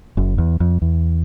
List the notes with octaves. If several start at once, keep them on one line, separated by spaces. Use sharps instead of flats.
F#1 F#2
E2
F2
E2